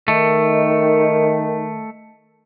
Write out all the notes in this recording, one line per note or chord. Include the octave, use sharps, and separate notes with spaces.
D#3 A3